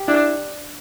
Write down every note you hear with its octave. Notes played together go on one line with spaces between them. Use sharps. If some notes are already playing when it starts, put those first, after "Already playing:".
Already playing: G4
D4 E4